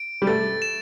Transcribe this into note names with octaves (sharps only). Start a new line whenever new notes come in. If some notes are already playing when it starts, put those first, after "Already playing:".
Already playing: D7
G3
A3 A6
E7